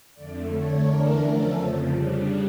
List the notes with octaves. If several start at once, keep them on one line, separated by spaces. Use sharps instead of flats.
F2 D3 A3 D5
D3 A3 D4 C#5
E2 E3 A3 D4 A#4
D3 F3 A3 C#4 A4
F2 C#3 F3
C#3 G3 D4